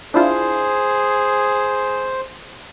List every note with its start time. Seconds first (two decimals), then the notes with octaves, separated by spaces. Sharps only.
0.14 D4 E4 F4 G#4 C5